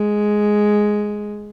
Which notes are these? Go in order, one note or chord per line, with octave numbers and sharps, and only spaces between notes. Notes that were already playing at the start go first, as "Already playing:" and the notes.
Already playing: G#3